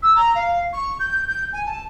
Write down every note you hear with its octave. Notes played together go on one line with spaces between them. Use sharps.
E6
A#5
F5
C#6
G6
G6
G#5
A5